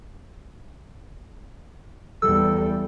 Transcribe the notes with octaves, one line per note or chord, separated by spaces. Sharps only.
E2 G3 A4 E6